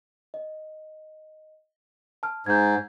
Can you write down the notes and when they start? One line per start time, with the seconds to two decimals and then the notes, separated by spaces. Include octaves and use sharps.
0.34 D#5
2.23 A5 F6
2.46 G#2 G6 G#6